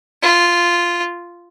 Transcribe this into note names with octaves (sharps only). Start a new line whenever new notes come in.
F4